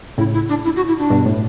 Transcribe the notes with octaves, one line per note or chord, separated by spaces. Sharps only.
A2 C#3 E4
E4
D4
E4
F#4
E4
D4
G2 B2
A2